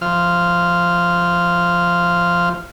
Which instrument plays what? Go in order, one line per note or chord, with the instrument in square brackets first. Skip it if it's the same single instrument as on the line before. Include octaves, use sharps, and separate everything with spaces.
[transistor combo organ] F3 F6